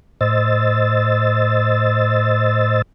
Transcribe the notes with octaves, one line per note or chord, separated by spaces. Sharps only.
A2 C5 D#5 E6 A6